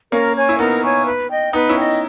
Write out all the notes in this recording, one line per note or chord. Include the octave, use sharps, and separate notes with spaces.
A#3 C#4 A#4
C#5 G#5 C#6
E4
B3 D#4 A#4
C#5 G#5 C#6
B4
D#5 G5
B3 D#4 B4
C#4 E4
D#5 G5